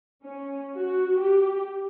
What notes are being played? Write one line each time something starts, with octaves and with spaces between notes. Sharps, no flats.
C#4
F#4
G4